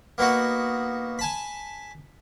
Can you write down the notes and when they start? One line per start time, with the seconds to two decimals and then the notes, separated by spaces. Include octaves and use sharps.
0.18 A#3 B3 D#4 F#4 F#5
1.19 G#5 A5 B5